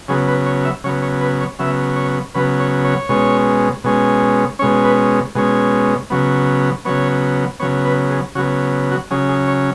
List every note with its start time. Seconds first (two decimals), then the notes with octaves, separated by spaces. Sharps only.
0.08 C#3 F#3 B3 G#4
0.28 B4
0.46 C#5
0.65 E5
0.84 C#3 F#3 B3 C#5
1.02 C#5
1.21 B4
1.41 C#5
1.59 C#3 F#3 B3 E5
1.96 C#5
2.34 C#3 F#3 B3 B4
2.60 C#5
2.85 C#5
3.09 B2 G#3 C#4
3.84 B2 G#3 C#4
4.59 C#4 C#5
4.62 B2 G#3
4.84 B4
5.35 B2 G#3 C#4
6.10 C#3 F#3 B3
6.85 C#3 F#3 B3 C#5
7.60 C#3 F#3 B3 C#5
7.85 B4
8.10 G#4
8.35 C#3 F#3 B3 F#4
8.92 F#4
9.11 C#3 F#3 C#4 G#4
9.29 G#4
9.48 C#5